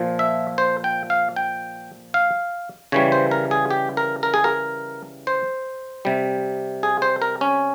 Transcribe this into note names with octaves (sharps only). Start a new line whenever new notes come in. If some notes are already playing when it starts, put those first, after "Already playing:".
Already playing: A#2 F3
E5
C5
G5
F5
G5
F5
C#3 E3 G3 C#5
C5
A#4
G#4
G4
A#4
A#4
G#4
A#4
C5
C3 G3
G#4
C5
A#4
C#4